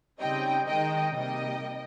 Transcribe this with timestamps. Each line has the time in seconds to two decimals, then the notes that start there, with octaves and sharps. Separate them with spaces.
0.20 C#3 G3 C4 D#4 D#5 G5
0.67 D#3 G#3 D#4 D#5 G5
1.15 C3 G3 A#3 D#4 D#5 G5